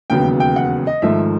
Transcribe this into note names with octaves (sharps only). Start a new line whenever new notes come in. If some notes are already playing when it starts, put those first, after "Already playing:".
E1 D#2 C#3 F#3 B3 G5
G5
F#5
D#5
G#1 G#2 F3 A3 E5